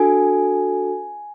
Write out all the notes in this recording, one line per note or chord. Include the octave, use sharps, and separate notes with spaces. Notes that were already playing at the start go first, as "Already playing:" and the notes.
Already playing: D4 F#4 A4 G#5